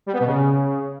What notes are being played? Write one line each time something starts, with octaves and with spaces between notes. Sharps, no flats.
G3
B3
B2
C#3